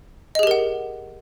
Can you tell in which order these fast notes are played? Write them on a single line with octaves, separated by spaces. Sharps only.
D#5 G#4 G4 A#4 F#5